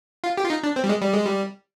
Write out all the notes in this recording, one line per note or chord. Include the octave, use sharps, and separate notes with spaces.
F4
G4
F4
D#4
D4
C4
G3
G#3
G3
G#3
G3